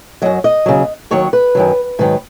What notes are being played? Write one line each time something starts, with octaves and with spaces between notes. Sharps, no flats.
F#2 F#3 D#5
D#5
D#2 C#3 F#3
D#2 D#3 F#3 C#5
B4
F#2 D#3 F#3
G#2 D#3 F#3 B4